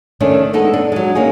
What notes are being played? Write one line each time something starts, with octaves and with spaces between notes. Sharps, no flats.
D#3 A3 C#4 D4
G#3 B3 D#4 A4
D4
F#3 G#3
A#3 C#4 D#4 G#4